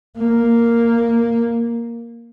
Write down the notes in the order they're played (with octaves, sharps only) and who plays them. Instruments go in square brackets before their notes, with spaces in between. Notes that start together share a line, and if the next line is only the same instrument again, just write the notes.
[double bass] A#3